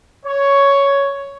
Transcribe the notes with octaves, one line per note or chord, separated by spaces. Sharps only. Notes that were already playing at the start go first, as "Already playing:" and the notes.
C#5